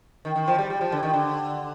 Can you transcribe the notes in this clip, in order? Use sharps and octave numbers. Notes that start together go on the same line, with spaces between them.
D#3
D#3
F3
G3
G3
F3
D3
D#3
D3